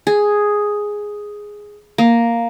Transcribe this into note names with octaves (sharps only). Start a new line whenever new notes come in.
G#4
A#3